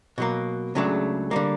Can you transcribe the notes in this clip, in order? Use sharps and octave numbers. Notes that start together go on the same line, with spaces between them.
B2 F#3 A#3
C#2 C#3 F#3 A3 D4
D3 G3 A#3